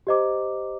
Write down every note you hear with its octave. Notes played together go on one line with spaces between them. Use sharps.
G4 C5 D#5 A#5 D6